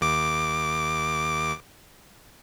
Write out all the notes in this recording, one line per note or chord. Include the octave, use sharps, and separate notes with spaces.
D#2 D6